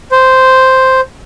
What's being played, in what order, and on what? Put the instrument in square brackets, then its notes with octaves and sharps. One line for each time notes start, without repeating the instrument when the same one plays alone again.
[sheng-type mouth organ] C5